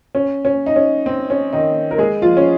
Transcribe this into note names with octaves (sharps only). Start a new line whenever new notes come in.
C#4
C#4
D#4
C#4
C4
C#4
D#3 D#4
A#4
G#3 G#4
F3 F4
C#4